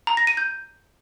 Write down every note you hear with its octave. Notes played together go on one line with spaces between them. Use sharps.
A#5
A#6
D#7
G6